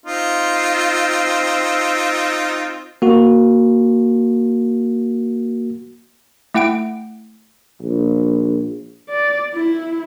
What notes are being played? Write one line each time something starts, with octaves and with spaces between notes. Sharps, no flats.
C4 D#4 F4
A#3 F#4
A3 E4 F#5 G5 D7
A#1
D5
E4